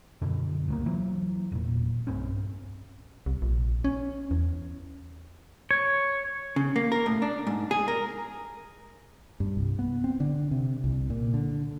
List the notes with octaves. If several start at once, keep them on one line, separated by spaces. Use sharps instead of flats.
F#2 B2 D3
C#2 F#3 A#3
E3 F#3
E1 A#2
B1 G2 C4 C#4
C2
A#1
C#4
E2
C#5
C#3
A#3
A#4
A2
D4
G#2
G#4
A#4
G2
C2
B3
C4
D3
C3
C2
A#2
D3